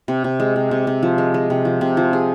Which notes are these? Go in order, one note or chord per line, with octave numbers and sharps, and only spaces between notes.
C3
C3
G#3
C3
C3
C3
F3
G#3
G#3
C3
F3
C3
F3
G#4